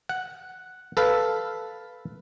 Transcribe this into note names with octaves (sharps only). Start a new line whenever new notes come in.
F#5
A4 B4 F5